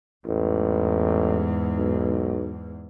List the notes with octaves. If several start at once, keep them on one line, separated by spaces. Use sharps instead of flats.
A1 E2 G#2
B1